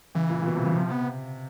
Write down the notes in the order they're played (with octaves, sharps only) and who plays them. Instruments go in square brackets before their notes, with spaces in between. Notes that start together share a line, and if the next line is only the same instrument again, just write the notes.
[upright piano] C#3 [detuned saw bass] E3
[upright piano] A#2
A#2
B2
C3
C#3
[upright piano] C3 [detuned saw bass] F3
[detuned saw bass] B3